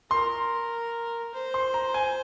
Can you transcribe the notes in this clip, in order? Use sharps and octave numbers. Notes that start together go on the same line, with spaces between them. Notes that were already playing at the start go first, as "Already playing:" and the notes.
A#4 C6
C5
C6
A#5
G#5